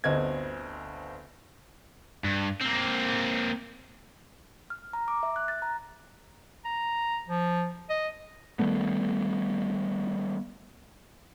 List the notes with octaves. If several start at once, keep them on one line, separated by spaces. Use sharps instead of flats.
G1 D2 C4 D#5 G#6
G2
A#3 C4
F6
A#5
D6
E5
F#6
A6
A#5
A#5
F3
D#5
D#3 G3 A3 B3